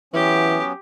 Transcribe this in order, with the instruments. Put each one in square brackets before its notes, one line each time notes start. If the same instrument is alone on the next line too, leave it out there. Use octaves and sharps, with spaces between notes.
[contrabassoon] E3 [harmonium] F#3 B3 C#4 [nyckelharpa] G4